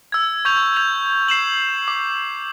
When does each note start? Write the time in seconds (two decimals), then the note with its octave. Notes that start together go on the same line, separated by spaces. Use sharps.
0.12 E6 G#6
0.45 C#6 G6 G#6 F7
0.76 G6 F7
1.28 C7 E7 F#7
1.88 D6